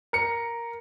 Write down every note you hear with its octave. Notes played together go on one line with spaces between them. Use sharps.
A#4 C#7